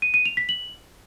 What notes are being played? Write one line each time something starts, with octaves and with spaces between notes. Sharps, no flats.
D#7
D#7
F7
B6
F#7